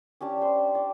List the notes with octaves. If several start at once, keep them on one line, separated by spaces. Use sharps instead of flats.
C#4 D4 G4 A5
C5
D5